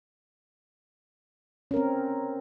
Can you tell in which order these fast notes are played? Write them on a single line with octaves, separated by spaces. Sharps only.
C#4 A#4 C4